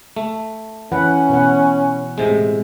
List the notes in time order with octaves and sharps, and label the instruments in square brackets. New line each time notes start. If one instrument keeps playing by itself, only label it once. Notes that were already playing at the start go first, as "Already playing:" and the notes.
[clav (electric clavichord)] A3
[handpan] E3 B4 F#5 [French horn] C#4
[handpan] B2 B4 F#5
[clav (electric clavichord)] A2 C3 G#3